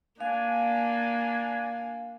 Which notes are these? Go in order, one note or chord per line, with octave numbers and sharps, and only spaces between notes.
A#3 D4 F5 G#5